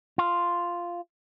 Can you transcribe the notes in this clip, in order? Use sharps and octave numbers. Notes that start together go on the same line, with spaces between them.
F4